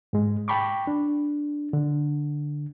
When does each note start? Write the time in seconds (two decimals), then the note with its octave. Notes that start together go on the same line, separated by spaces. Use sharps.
0.13 G#2 G#3
0.48 G5 A5 B5 C#6 D6
0.87 D4
1.73 D3